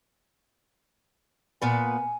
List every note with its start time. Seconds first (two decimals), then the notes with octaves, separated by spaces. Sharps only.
1.62 A#2 B3 B4 G#5